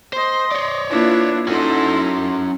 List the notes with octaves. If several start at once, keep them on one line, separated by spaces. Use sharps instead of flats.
C5 D#5 C6
C#5 D5
A#3 D4 E4 F4 B4
C#4 D#4 E4 F#4 A4 C6